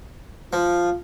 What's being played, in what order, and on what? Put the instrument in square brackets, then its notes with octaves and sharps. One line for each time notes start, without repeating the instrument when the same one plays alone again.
[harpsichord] F3 [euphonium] F4